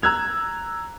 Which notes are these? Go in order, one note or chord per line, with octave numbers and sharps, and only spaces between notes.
A#5 E6 F#6 G#6 F7